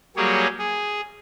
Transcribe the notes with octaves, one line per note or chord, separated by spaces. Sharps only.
F#3 G3 A#3 G4 G#4 C#5
G#4